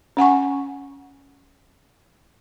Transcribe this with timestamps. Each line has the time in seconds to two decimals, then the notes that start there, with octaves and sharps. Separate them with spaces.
0.17 C#4 F#5 G#5 C#6